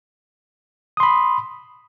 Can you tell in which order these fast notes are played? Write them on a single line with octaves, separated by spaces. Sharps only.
D#6 C6 B5